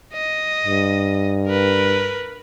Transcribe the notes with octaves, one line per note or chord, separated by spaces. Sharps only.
D#5
G2
A#4 B4